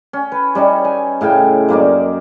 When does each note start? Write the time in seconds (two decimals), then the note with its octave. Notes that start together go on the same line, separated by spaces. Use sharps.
0.13 C#4
0.32 B4
0.55 G3 C#4 D#4 C#5
0.85 G#5
1.21 A2 C#3 F5 G5
1.69 F#2 A#3 D#4 D5